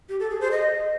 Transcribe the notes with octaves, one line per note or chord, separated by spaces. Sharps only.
G4
A4
G#4
C5
D#5